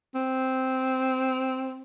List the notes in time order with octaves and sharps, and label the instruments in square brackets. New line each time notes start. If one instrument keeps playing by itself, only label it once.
[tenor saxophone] C4